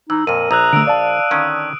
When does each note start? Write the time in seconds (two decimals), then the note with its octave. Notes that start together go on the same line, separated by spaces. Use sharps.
0.10 E3 D#4 E6
0.27 F2 A#2 A#4 D#7
0.51 A#1 A#5 D#6 E6 F#6
0.73 D3 A3 E6 D7
0.87 D5 F5 A5
1.31 D3 D#3 C#4